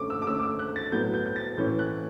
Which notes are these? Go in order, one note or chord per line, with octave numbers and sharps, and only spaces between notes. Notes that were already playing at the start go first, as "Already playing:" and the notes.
Already playing: D3 A3 C#4 C#6 D6
E6
D6
D3 A3 C#4 E6
D6
E6
F#6
A6
A2 F#3 B3 G6
G6
G6
A6
A2 E3 A3 C#4 G6
F#6